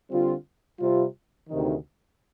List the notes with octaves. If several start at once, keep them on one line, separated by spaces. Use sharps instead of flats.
D3 G3 C4 F4
C3 G3 C4 F4
D2 C3 D#3